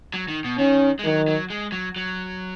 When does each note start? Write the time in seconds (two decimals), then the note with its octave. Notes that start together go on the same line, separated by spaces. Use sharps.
0.14 F#3
0.28 D#3
0.44 B2
0.58 D#3 C#4
0.99 G#3
1.04 D#3 F#3
1.28 F#3
1.50 G#3
1.72 F#3
1.96 F#3